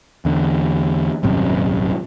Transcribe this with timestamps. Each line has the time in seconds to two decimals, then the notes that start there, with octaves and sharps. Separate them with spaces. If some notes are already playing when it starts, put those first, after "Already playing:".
0.25 E2 D3
1.23 D#1 G#1 F#2 C3